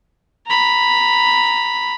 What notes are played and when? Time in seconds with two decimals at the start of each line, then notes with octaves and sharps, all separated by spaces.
0.47 A#5 B5